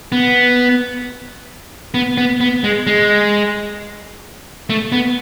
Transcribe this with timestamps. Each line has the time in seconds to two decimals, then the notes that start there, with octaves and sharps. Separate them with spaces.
0.12 B3
1.94 B3
2.18 B3
2.41 B3
2.64 G#3
2.87 G#3
4.70 A3
4.92 B3